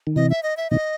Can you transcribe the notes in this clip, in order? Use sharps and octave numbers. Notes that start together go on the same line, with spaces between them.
D#3
C3 E3 D#5
E5
D#5
E5
B2 D#3 D#5